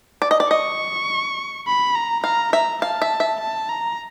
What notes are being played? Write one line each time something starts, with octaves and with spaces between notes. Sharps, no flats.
D5
D#5
D5
D#5 C#6
B5
A#5
F5 A#5
E5 A#5
F5 A5
E5
E5
A5
A#5